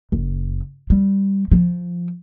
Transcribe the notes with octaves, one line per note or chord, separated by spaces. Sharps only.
F#1
G3
F3